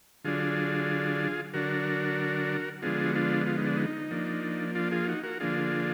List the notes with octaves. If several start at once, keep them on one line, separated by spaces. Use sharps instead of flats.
D3 F#3 D4 F4 G#4
D3 F#3 D4 F#4 A#4
D3 F3 G#3 B3 D4 F4 G#4
F#4
D4 F4
F4
D#4
D4
D#4
F3 A#3 D4
D4 F4
F4 G#4
D#4 F#4
F#4 A#4
D3 F3 A#3 D4 F4 G#4